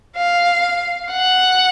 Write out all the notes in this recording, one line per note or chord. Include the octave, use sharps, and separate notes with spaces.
F5
F#5